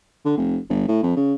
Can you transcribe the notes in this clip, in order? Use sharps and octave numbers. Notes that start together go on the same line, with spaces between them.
D3
F1
G1
A2
F2
C#3